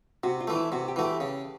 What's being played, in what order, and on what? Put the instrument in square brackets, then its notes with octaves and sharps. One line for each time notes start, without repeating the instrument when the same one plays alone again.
[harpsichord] C3 [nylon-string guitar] F#4
[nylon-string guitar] F4
[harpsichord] E3 A3
[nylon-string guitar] E4
[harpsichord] C3 [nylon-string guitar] F#4
[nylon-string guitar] G4
[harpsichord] E3 A3 [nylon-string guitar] F#4
[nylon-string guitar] G4
[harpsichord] C#3